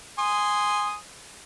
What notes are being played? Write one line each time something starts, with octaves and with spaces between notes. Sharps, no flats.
G#5 C6 D#6